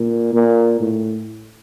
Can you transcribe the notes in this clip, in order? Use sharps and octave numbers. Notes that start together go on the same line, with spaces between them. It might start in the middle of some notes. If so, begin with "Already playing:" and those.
Already playing: A#2
A#2
A2